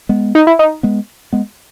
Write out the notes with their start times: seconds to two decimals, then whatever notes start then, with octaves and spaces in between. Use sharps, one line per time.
0.09 G#3 B3
0.35 D#4
0.47 E4
0.59 D#4
0.83 G#3 B3
1.33 G#3 B3